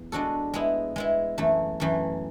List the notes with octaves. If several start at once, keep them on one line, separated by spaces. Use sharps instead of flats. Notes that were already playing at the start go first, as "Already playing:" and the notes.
Already playing: E2
G#3 D4 F#4 A4
G#3 B3 E4
G#3 B3 E4
F#2 E3 A3
F#2 E3 A3